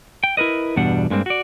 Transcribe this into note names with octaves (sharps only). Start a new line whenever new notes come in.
G5
E4 A#4 B4 D#5
E2 G2 B2 G3 D4 F#5
G2 G#3 A#3 C4
F#4 D5